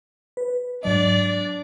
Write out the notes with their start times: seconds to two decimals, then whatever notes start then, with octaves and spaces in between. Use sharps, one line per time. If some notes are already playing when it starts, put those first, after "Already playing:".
0.37 B4
0.83 G#2 F#3 D4 D5 D#5
1.26 A6